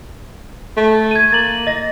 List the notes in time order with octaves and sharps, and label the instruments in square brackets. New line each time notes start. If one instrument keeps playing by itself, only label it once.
[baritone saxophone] A3
[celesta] G#6 D#7
[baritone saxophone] A#3 [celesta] A6 F#7
[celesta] D#5 A#6